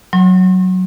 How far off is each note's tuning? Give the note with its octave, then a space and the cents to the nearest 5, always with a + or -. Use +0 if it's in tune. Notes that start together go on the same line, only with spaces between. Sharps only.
F#3 +0 C6 +45